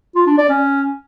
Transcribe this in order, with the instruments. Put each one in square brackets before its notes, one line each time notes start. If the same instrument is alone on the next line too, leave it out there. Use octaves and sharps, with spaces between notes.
[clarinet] F4
D4
D5
C#4